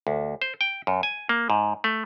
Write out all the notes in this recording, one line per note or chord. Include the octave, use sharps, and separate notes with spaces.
D2
C5
G5
F#2
G#5
A#3
G#2
A3